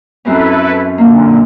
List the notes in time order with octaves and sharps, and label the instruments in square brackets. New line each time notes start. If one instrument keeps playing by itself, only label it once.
[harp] F#2 C4 C#4 [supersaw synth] E4 A4 B4
[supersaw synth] A#2 D3 [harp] A#3